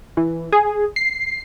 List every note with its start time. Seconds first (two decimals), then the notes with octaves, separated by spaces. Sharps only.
0.17 E3
0.52 G#4
0.96 C7